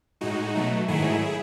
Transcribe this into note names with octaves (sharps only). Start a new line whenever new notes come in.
A2 G#3 D#4 F#4
B2 F#3 A3
G#2 D#3 F#3 A3 E4 G#4